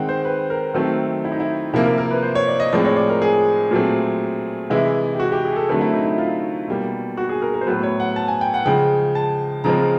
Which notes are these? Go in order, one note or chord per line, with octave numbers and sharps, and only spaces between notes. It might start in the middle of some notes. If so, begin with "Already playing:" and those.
Already playing: D#3 G#3 C4 F#5 G5
C5
B4
A#4
D#3 F#3 A3 C4 A4
E4
D#4
E4
C3 F3 A#3 E4
A#4
A#4
B4
C5
C#5
D5
D#5
A2 F3 G#3 C4 D5
C#5
D5
A#4
G#4
A#2 F#3 A3 C4
C3 E3 G#3 E4
G4
F#4
G4
G#4
A4
D3 F#3 A3 C4 A#4
E4
D#4
E4
F4
B2 G3 A#3
F#4
G#4
A#4
A#4
C5
A2 F#3 B3 B4
C#5
F#5
A5
G#5
G5
F#5
C#3 F3 G#3 G5
A5
C#3 F3 G#3 C4 A#5